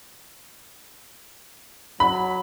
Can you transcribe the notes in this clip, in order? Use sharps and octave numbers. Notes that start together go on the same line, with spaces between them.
F#3 B5